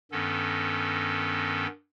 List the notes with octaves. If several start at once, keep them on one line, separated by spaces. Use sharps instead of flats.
G2 D#3 B3 C#4 A4